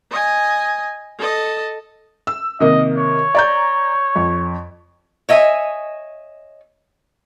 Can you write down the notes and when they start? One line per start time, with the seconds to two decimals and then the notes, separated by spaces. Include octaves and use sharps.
0.11 D#5 G#5
1.19 A4 D#5
2.27 E6
2.60 C3 D#3 A#3 D#5
2.98 C#5
3.35 D5 A#5 G6
4.16 F2
5.29 C#5 D#5 E5 G#5